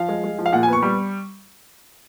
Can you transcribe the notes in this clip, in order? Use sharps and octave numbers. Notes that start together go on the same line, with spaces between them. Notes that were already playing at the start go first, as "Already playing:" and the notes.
Already playing: F3 F5
G#3
G#3
F3
F5
A#2 F#5
G#5
B3
C#6
G3